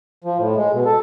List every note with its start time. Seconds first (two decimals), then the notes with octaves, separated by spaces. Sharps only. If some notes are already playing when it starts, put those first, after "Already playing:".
0.24 F3
0.38 A2
0.56 G#3
0.73 B2
0.85 A4